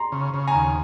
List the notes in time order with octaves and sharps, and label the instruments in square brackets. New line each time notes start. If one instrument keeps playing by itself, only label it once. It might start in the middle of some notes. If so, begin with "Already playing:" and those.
Already playing: [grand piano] A#5 C6
[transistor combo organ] C#3
C#3
[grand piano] G#5 A#5
[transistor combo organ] D#2